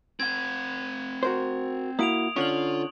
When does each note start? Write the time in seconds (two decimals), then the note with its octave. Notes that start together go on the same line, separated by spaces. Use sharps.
0.20 C4 F#5 G#6
1.23 F#4 A#4 C5
1.99 A#3 E4 F#4 D#6 D7 F7
2.36 D3 C#4 F4 C#6 F#7